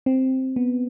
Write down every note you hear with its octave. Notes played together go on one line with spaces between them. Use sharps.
C4
B3